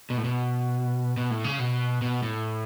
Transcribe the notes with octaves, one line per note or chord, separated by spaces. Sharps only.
B2
A2
B2
B2
A2
C#3
B2
B2
A2